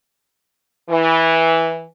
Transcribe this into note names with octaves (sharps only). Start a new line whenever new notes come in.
E3